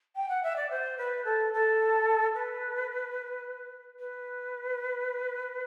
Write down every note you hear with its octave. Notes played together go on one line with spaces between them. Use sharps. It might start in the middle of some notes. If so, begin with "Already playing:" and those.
G5
F#5
E5
D5
C5
B4
A4
A4
B4
B4